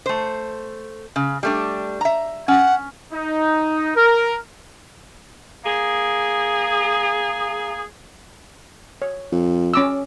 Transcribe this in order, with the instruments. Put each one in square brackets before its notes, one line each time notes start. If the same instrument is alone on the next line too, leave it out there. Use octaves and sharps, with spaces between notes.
[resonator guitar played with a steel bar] A3 C5
C#3
G3 A3 D4
E5 A#5
[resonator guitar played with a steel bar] C#4 [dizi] F#5
[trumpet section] D#4
A#4
[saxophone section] A#3 G#4
[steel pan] C#5
[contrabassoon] F2
[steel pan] C#4 D6 E6